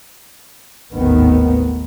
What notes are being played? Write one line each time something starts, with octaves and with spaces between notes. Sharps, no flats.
G#1 D#2 A2 D#3 B3